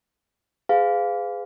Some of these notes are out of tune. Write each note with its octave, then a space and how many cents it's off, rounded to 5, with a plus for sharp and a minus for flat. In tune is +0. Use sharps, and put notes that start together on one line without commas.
G#4 +0 B4 +45 F5 +0